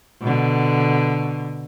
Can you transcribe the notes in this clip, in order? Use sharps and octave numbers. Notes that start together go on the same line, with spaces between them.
B2 D3